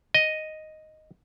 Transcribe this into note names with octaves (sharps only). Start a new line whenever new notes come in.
D#5